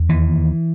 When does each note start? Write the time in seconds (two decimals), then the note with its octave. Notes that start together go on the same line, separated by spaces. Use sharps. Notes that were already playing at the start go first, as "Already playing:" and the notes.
Already playing: E2
0.09 D#2 E3